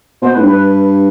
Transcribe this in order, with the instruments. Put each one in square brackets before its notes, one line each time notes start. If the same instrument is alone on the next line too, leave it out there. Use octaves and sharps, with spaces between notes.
[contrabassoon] B2 [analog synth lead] C5
[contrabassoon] A2 [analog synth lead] B4
[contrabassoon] G2
[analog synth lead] B4